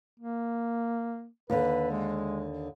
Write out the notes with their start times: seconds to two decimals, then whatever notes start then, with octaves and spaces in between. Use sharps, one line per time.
0.20 A#3
1.50 D#2 D3 B4
1.91 G#3